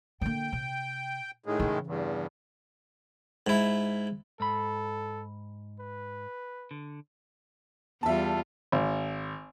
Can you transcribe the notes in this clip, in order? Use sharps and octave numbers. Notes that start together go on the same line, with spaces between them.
D3 A#3 G5
C3
A2 D#3 G#3
C#3 E3
E2 G2
G#2 E4
G#2 A4 B5
B4
D3
E2 G3 F4 E5 A5
G#1